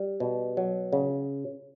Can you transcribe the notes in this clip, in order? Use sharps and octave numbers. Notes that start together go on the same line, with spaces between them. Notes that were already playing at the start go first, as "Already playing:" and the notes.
Already playing: G3
B2
F#3
C#3